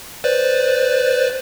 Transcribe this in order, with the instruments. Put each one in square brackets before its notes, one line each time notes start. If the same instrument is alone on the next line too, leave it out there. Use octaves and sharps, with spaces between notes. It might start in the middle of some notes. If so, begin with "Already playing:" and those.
[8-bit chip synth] B4 C5 D5